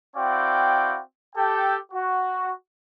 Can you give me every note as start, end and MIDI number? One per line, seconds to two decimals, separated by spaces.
0.16 1.01 60
0.16 1.01 64
0.16 1.01 66
0.16 1.01 74
0.16 1.01 77
0.16 1.01 79
1.36 1.77 67
1.36 1.77 69
1.36 1.77 79
1.92 2.52 66